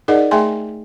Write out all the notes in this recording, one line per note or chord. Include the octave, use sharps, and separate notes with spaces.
D#4 G#4 A#4 D5 D#5 F#5
A3 G#4 E5 G5 G#5 C6